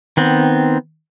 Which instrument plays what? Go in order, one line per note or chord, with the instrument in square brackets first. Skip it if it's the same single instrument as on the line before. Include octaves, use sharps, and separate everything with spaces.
[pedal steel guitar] D#3 B3 C4